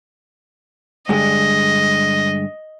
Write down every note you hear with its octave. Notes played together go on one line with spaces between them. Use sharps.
G2 D3 G#3 D#5